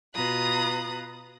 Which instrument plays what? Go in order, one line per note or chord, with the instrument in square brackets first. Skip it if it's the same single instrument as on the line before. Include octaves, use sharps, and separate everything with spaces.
[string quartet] B2 F4 B4 A#5 D#6 F#6